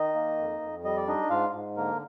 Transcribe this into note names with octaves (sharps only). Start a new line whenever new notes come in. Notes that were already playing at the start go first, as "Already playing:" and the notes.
Already playing: D#3 D#4 D#5
A#3
F2
F2
G3 D#5
D5
D4 D#4 D#5
G#2 F4 F5
G#2
D3 A#3 A#4